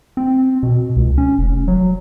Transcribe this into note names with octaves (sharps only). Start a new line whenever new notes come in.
C4
B2
C#2
C#4
F1
F#3